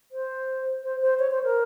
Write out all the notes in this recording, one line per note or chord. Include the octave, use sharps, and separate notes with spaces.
C5
C5
C5
C#5
C5
A#4